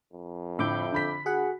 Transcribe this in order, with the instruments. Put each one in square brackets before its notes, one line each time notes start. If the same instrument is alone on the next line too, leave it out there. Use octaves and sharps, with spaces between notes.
[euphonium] F2
[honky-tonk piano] A2 D3 [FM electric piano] E5 D6 G6
[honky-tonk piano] D3 B5 B6
[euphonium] F#4 [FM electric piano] G#4 F#5